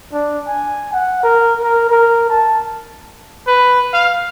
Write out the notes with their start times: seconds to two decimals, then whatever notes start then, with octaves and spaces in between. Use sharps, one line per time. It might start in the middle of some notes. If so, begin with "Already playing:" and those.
0.13 D4
0.48 G#5
0.94 F#5
1.23 A#4
1.62 A#4
1.90 A#4
2.30 A5
3.47 B4
3.93 F5